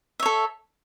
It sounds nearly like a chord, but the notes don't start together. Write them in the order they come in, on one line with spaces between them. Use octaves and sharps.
E5 C#5 A4